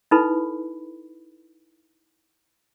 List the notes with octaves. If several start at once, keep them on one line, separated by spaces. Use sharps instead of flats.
D#4 E4 A4 B4 B5